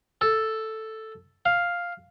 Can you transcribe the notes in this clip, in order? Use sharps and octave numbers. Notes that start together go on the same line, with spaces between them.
A4
F5